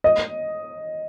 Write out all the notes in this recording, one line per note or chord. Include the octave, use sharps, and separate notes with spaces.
D#5